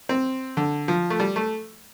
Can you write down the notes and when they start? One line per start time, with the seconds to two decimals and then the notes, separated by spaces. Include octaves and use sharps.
0.09 C4
0.57 D3
0.88 F3
1.10 A3
1.20 G3
1.36 A3